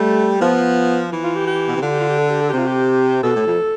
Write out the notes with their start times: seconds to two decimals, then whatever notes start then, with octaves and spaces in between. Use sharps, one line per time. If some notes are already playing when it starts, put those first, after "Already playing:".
Already playing: G3 A3
0.41 F3 B3
1.12 E3
1.24 F4
1.35 G4
1.47 G4
1.68 B2
1.75 C3
1.82 D3 F4
1.92 G4
2.00 F4
2.09 G4
2.18 A4
2.30 G4
2.41 A4
2.49 C3 G4
2.58 F4
2.67 G4
3.23 B2 A4
3.36 A2
3.47 F2